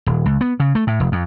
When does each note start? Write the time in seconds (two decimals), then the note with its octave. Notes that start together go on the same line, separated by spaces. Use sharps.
0.06 D#1
0.26 C#2
0.41 B3
0.60 C#3
0.75 A3
0.87 A2
1.00 F1
1.12 F2